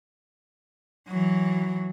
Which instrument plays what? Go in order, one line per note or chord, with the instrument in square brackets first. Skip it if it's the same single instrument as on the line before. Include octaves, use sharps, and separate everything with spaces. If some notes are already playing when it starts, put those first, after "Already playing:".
[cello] E3 F#3